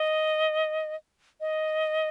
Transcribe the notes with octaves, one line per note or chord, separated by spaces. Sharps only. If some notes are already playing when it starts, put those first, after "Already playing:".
Already playing: D#5
D#5